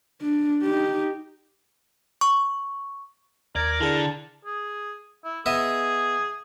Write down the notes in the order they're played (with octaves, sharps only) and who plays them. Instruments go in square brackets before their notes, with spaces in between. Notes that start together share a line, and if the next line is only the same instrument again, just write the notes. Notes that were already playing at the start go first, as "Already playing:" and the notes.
[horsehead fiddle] D4
D#4 G4
[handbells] C#6
[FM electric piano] D#2 [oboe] A#4 [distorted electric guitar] D5 [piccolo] G#6
[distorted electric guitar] D3 [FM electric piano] E4 G#4 D5 [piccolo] A5
[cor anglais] G#4
E4
[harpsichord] B3 D#5 E5 [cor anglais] G#4